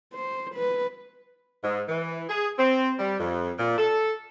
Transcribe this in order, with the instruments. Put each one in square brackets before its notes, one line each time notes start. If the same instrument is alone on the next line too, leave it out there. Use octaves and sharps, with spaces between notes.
[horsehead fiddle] C5
B4
[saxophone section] G#2
E3
G#4
C4
G3
F2
A#2
A4